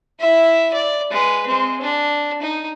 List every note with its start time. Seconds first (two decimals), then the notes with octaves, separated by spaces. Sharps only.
0.20 E4 E5
0.73 D5
1.11 G#3 B4
1.47 G#3 C4
1.81 D4
2.42 D#4